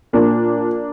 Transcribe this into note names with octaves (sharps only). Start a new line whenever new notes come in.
A#2 F3 A#3 D4